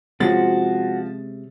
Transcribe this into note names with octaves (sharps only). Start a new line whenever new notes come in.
C3 F3 G#3 C#4 F#4 A6